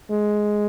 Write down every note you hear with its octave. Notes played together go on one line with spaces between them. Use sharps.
G#3